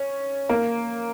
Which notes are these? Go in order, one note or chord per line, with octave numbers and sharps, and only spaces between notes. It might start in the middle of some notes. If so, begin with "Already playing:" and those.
Already playing: C#4
A#3